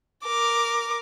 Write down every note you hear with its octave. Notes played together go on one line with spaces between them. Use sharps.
A#4 D6